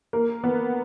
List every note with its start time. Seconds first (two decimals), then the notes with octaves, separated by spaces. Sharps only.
0.13 A#3
0.44 B3